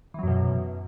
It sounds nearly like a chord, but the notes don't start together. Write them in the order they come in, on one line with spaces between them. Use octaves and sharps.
E3 F#3 F#2 B2